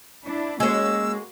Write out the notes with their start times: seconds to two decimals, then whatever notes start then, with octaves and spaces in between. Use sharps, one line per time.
0.25 D4 E4
0.60 G#3 A#3 C#4 F#4 E6